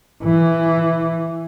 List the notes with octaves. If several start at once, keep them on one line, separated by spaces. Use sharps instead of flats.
E3